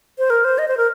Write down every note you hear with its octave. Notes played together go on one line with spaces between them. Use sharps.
C5
A#4
C5
D#5
C5
A#4